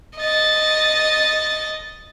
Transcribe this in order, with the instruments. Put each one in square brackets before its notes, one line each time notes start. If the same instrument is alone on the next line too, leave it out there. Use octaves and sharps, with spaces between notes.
[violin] D#5 A6